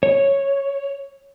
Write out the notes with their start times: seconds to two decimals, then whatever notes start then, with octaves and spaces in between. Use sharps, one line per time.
0.03 C#5